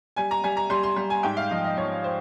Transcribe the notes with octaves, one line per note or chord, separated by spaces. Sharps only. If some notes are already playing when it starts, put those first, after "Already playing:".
G3 G#5
A#5
G3 G#5
A#5
G3 C6
C6
G3
G#5
G#2 G5
F5
F3 D#5
D#5
F3 C#5
C5